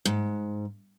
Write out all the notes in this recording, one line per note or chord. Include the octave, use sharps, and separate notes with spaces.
G#2